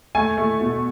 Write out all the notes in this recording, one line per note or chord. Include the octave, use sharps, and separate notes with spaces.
A3 G#5
A3
B2